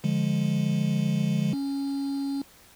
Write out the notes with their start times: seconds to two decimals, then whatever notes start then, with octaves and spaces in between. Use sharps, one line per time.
0.04 D3 F3 G#3
1.53 C#4